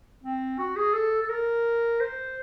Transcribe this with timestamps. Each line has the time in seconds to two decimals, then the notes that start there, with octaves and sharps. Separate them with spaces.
0.24 C4
0.58 F#4
0.76 G#4
0.94 A4
1.22 A4
1.29 A#4
2.01 C5